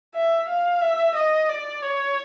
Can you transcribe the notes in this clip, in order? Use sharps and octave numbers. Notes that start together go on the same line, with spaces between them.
E5
F5
E5
D#5
D5
C#5